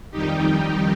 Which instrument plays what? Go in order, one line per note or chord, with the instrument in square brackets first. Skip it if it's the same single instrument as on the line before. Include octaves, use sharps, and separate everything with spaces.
[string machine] F2 D#3 G3 D#4 G4